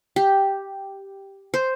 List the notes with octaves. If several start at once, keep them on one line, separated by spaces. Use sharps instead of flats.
G4
C5